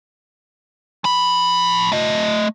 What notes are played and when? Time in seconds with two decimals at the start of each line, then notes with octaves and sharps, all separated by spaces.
1.04 F3 B5
1.92 A3 D#5